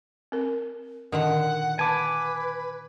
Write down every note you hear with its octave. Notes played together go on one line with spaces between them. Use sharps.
C4 A#4
A#2 D3 D#3 F#5
B4 G#5 A5 D6